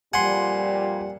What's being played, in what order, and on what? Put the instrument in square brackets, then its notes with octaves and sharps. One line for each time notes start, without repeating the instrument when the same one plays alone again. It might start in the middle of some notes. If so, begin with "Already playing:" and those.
[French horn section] F2 A#2 G3 [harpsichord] F#5 [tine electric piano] G#5 C6